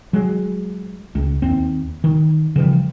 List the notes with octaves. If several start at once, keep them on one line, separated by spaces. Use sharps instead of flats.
F#3 G#3
C#2
D#2 C4
D#3
C#3 E3 F3 G3